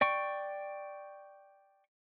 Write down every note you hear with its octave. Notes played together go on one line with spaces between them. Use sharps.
D5 G5 C#6